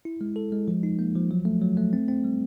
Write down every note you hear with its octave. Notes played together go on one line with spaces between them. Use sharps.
E4
G#3
A4
G#3
F3
D#4
A#3
F3
F#3
A3
F#3
A3
C4
C4
G3